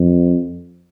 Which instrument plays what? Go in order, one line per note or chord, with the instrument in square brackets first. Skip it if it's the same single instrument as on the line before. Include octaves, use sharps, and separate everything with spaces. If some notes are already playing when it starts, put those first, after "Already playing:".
Already playing: [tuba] F2